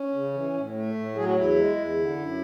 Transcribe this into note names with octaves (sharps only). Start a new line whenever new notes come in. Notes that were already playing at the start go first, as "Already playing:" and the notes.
Already playing: C#4
C#3
E3
A2
A3
A2
F#3 G#4
F#4
E2 E4
G#3
E2
D3
F#2